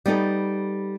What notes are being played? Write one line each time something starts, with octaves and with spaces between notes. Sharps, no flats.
G3 B3 D#4 A4